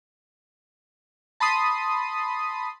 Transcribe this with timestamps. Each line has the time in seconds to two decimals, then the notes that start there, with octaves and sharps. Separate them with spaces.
1.40 A5 B5 C6 D#6